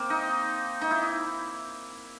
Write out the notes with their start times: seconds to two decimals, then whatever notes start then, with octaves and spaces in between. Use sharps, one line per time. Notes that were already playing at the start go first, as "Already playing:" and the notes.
Already playing: A#3 C4
0.10 D#4
0.81 D#4
0.91 E4